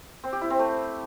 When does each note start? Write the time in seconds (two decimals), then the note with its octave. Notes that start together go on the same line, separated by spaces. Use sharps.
0.24 C4
0.33 G4
0.41 E4
0.50 C4
0.59 A3